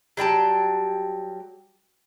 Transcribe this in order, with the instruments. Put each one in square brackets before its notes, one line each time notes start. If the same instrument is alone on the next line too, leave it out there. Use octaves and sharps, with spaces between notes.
[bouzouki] F#3 G3 G5 A5